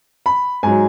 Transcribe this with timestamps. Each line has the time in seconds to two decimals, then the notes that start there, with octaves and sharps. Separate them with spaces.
0.26 B5
0.63 G#2 F#3 G#5